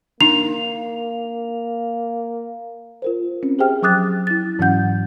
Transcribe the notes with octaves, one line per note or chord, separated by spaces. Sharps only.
A#3 D4 D#4 F7
F4 A#4 C5
C4 C#4
G4 G#4 C5 E5 G5 F6
F3 F#3 D6 D#6 F#6 A6
E4 A6
G#2 E3 F#3 C#4 F#5 G6